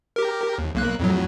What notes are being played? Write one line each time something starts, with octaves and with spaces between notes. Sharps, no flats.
G4 A#4
D#2
B1 A#3 F#6
F2 A2 F#3